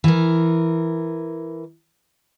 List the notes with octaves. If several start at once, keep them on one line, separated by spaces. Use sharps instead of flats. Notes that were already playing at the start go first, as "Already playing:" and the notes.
E3 A#4